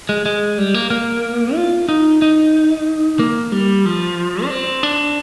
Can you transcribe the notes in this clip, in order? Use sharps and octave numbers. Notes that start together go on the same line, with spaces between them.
G#3
G#3
G3
A#3
A#3
F4
D#4
D#4
A#3
G3
F3
D4
C4
D4